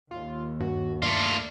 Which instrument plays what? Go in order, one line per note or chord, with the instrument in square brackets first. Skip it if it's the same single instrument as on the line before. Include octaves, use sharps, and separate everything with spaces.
[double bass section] D#2 [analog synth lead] F4
[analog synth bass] G2 [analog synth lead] F#4
[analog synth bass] G2 [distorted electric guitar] A3 F4 [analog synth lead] D5